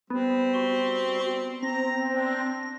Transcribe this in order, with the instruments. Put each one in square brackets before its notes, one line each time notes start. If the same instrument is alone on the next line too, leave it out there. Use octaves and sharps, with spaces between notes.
[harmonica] G3 C4 [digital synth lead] B3
[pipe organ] F#4 C6
[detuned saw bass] C4 [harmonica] A#5 [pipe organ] A#6
[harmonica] D4